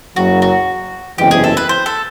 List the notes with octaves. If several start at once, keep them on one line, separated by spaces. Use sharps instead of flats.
F#1 F#2 C#3 F#3 F#4
F#4
F#1 E2 C3 E3 G#3 G4
G#4
A4
B4
C5
A4